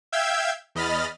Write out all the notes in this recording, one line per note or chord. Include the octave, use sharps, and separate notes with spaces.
E5 F5 G5 E6 G6 G#6
E2 D#5 B5 F6 A6